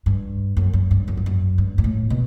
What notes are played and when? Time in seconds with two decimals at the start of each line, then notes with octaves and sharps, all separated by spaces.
0.06 G2
0.57 F#2
0.73 F#2
0.91 G2
1.08 F#2
1.17 G2
1.26 F#2
1.58 G2
1.78 G2
1.84 A2
2.10 B2